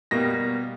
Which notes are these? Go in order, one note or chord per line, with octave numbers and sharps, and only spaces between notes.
B2 G3 A#3 A#6